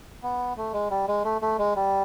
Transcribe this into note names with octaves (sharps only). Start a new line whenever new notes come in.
B3
A3
G#3
G3
G#3
A3
A3
G#3
G3